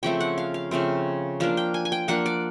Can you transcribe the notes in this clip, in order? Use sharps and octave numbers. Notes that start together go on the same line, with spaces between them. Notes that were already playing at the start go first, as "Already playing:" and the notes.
C#3 F3 A3 C4 G5
F#5
F5
F5
C#3 F3 A3 C4
F3 A#3 D4 F5
G5
G#5
G#5
G5
F3 A#3 D4 F#5
D5